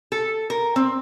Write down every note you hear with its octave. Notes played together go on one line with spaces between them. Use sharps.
A4
A#4
C4